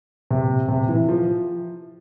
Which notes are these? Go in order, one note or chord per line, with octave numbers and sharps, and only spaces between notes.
C3
C3
E3
F3